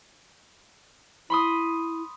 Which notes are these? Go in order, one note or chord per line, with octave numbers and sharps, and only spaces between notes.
E4 B5 C6 D#6